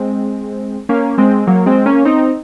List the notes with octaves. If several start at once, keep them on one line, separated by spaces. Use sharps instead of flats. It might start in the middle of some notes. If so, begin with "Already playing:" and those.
Already playing: G#3 C4
A#3 C#4
G#3 C4
F#3 A#3
G#3 C4
A#3 C#4
C4 D#4